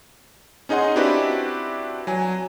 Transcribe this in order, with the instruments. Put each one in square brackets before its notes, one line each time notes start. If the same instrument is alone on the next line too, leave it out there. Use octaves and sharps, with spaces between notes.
[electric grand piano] C#4 D#4 G#4 D#5 F#5 C6
C4 D4 E4 F#4 G4 B4
F#3 G#5